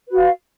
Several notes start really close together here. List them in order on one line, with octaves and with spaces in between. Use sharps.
B4 F#4 F5